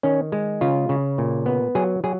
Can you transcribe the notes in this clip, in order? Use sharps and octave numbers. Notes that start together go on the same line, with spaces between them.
D#3 C#4
G#3
C#3 F4
C#3
A#2
B3
F#3 G#4
F#3 G#4